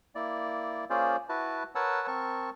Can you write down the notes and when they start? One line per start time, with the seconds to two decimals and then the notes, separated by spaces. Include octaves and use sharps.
0.15 A#3 E4 D5
0.90 A#3 C#4 F4 G#4 C5 D5
1.29 E4 F#4 B4 A5
1.75 A#4 B4 C#5 F#5 A5 E6
2.07 C4 A#4 A5 C#6